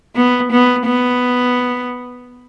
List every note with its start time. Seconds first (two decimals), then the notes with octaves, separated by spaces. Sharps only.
0.16 B3
0.52 B3
0.86 B3